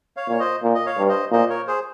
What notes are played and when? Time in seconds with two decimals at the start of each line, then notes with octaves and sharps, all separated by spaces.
0.16 C#5 F5
0.29 A#2 C#5
0.40 C5 D#5
0.63 A#2
0.74 D#5
0.86 C#5 F5
0.98 G2
1.09 C5 D#5
1.32 A#2 C5 D#5
1.49 A#4 C#5
1.67 G#4 C5